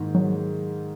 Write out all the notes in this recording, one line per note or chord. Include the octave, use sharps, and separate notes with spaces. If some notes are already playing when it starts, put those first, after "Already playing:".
Already playing: G#2 D#3 A#3
F#3